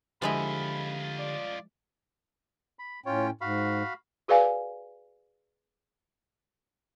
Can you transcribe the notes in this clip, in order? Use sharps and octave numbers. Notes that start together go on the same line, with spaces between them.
D3 F3 G#3 E4 F4 G4 D#5 B5
D5
B5
A2 C#4 F4 C#5 G5
G#2 F#4 F5 B5
F#4 G#4 B4 D5 F5 G#5